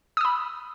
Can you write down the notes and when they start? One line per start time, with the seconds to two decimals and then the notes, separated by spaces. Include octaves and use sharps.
0.17 D#6
0.21 E6
0.25 B5